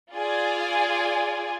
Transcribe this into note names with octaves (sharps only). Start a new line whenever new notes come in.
F4 G#4 D5 G#5